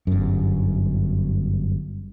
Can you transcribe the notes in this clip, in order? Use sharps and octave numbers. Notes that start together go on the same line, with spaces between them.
G1 F#2